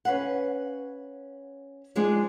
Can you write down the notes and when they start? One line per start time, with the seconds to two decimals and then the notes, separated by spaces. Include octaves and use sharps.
0.05 C#4 B4 F5 F#5
1.95 F3 G#3 D4 D#4 D5 D#5